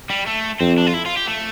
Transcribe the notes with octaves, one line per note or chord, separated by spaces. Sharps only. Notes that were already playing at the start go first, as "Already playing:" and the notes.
G3
A3
F2 C4
D4
F4
E4
F4
G4
A3